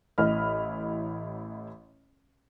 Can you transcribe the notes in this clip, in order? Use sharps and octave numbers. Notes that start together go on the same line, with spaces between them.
A1 A2 E4 D#5 B5 F6